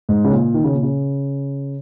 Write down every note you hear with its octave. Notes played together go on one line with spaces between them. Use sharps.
G#2
C#3
A#2
D#3
C#3
A#2
C#3